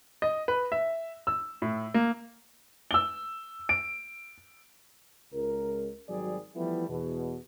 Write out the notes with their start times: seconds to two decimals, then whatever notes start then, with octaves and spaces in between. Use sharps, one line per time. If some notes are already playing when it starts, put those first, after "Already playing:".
0.22 D#5
0.48 B4
0.72 E5
1.27 E6
1.62 A2
1.94 A#3
2.91 E6 G7
3.69 D7
5.33 C#2 A#4
6.09 G#1 F#3 G3 G#4 D5
6.55 E3 F3 G3 A3 B3 E4
6.89 E2 B2